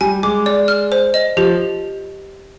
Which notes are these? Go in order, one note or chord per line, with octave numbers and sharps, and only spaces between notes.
G3 G#5
G#3 D6
D5
F6
C5
D#5
F3 G4